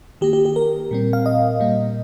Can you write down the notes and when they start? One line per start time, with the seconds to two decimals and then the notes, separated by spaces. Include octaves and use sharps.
0.21 D#3 A#3 G4
0.33 G4
0.45 G4
0.56 A#4
0.91 A#2 G3 C4
1.13 F5
1.26 D#5
1.60 A#2 G3 A#3